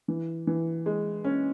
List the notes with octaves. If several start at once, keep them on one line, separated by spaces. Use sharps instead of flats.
E3
E3
G#3
C#4